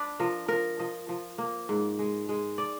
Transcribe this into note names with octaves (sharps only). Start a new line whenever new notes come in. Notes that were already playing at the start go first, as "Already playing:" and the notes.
Already playing: D4 B4 D5
F3 A#4
F3 A#4
F3 D#5
F3
A#3
G#2
G#3
G#3
D5